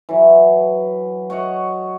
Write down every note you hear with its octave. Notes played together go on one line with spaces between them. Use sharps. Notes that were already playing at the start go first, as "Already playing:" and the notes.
E3 F#3
F#4 C#5 D#5 F#5